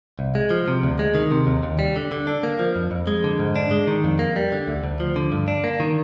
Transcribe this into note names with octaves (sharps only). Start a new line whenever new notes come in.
C2
G#3
F3
C3
D2
G#3
D#3
C3
D#2
D#2
G3
D3
D3
D4
A#3
F3
F2
F2
G#3
D3
G#2
D4
G#3
D#3
F2
A#3
G3
D3
D2
D2
F3
D3
G2
D4
A#3
D#3